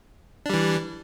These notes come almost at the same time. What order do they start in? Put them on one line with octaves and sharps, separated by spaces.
D4 G3 E3